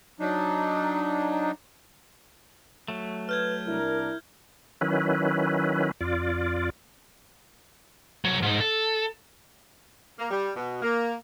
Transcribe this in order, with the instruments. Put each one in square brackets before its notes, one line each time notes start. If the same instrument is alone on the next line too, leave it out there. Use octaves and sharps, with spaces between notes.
[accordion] F#3 D4 D#4
[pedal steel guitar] F#3 A3
[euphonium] B4 [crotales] F6 G6 G#6
[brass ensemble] C2 D4 A#4 [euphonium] E4
[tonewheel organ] D#3 F#3 C#4 E4 B4
F2 F4 D5
[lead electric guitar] C2 F#3
G#2 D#4
A4
[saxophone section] A#3
G3
B2
A#3